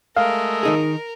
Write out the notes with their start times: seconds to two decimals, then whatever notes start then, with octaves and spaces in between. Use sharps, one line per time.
0.17 G#3 A3 A#4 F5
0.63 D#3 D#4 G#4